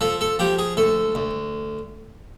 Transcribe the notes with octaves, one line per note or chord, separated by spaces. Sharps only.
F3 A4
A4
F3 G4
G#4
D2 A4
D2